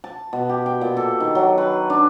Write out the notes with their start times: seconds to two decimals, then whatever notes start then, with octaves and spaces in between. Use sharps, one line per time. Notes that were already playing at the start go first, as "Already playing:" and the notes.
0.04 A5
0.33 B2
0.49 G4
0.66 G5
0.81 A#2
0.97 A4
1.20 D#3
1.35 F#3
1.58 B4
1.90 D4